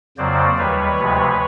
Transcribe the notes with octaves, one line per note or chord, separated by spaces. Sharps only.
F2 C#3 F#3 A#3 C5 D5
D#2 D#3 G3 B4 C#5
D2 C3 F3 G#3